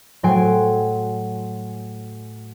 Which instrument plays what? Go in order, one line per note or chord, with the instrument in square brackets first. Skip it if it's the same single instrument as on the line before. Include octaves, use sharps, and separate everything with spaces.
[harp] A2 F#3 G5 G#5 C6 D7